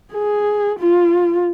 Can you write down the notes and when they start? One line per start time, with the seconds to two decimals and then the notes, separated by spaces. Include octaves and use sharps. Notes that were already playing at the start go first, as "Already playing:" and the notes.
0.12 G#4
0.79 F4